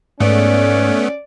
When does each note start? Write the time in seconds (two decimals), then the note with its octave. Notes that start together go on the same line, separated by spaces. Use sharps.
0.20 G#2 A3 B3 C#4 D5